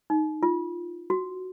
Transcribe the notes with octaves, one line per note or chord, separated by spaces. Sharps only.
D#4
F4
F#4